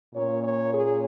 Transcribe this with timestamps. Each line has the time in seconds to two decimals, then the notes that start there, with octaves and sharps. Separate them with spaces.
0.14 A#2 A#3 C#4 C#5
0.42 C#5
0.71 G#4